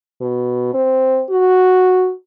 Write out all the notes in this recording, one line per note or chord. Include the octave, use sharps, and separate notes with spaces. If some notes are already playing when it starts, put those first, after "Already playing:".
B2
C4
F#4